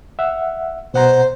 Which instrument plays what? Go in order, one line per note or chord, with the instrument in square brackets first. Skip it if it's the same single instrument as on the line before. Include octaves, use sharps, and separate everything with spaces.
[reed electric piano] E5 F#5
[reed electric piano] B2 F#5 A#5 [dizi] C5